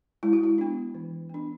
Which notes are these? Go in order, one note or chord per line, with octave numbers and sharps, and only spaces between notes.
G#3 E4
F#4
E4
B3 D4
E3
B3 D4